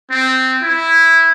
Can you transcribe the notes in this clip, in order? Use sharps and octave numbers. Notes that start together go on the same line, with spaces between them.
C4
E4